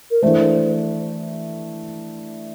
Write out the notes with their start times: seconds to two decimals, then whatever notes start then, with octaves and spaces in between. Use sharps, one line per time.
0.11 A#4
0.22 E3 A3 D4 C5